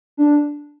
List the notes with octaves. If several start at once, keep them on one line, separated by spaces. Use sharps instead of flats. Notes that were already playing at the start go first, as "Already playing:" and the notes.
D4